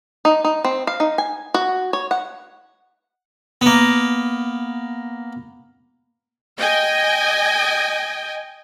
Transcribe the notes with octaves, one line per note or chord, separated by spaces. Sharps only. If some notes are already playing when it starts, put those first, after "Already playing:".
D#4
D#4
C4
F5
D#4
G#5
F#4
C#5
F#5
A#3 B3
D#5 G5 G#5